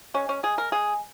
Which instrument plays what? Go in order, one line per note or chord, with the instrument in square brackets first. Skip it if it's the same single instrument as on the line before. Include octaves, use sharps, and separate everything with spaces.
[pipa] G#3 C#4
C#4
G#3 G#4
A#4
G#3 G#4